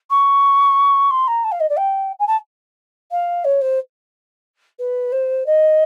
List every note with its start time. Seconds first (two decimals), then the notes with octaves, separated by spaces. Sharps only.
0.10 C#6
1.10 C6
1.27 A#5
1.44 A5
1.52 F5
1.60 D#5
1.69 D5
1.77 G5
2.19 G#5
2.27 A5
3.11 F5
3.44 C#5
3.61 C5
4.79 B4
5.12 C5
5.46 D#5